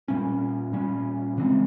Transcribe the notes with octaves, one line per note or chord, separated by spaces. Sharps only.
A#2 G3 C#4
A#2 G3 C#4
C#3 E3 G#3 C4